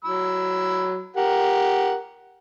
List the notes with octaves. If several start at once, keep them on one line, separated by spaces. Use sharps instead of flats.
F#3 B5 E6
G4 A#4 F#5